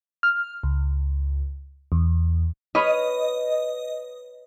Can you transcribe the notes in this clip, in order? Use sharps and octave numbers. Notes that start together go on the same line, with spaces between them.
F6
C#2
E2
B4 C#5 D#5 F6